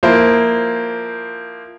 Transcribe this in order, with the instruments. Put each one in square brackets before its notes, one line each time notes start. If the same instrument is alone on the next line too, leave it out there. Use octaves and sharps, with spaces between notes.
[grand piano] F3 A#3 E4 C5